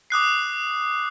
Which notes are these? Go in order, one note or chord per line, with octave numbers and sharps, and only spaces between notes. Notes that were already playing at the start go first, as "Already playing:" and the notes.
D6 D#6 F#6 C7